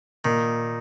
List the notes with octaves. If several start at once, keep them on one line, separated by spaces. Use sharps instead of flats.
A#2 D#3